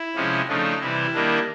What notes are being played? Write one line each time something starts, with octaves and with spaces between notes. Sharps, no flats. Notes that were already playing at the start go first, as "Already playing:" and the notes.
Already playing: E4
C3 F3 G#3 C#4
C#3 F3 A3 D4 D#4
C3 E3 G3 E4
D#3 G3 A#3 D4